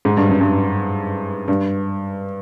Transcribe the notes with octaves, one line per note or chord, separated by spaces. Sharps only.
G#2
G2
F#2
G2
G2